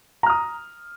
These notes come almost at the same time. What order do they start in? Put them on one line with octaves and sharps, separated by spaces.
A#5 F6 D#6